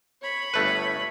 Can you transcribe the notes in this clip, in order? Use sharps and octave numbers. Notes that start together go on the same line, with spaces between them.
C#5 B5
G1 A3 B4